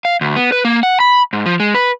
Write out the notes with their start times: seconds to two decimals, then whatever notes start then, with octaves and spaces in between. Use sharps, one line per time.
0.05 F5
0.21 D2
0.36 B3
0.52 B4
0.65 A#3
0.83 F#5
1.00 B5
1.33 G#2
1.46 F3
1.60 G#3
1.75 B4